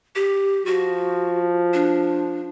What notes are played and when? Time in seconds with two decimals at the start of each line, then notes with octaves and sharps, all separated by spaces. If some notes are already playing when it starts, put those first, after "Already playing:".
0.16 G4
0.66 F3 F#4
1.74 D4